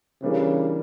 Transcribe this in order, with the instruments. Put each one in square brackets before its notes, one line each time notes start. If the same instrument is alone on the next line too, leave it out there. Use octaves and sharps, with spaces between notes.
[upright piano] E2 E3 G3 A#3 D4 [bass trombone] C#3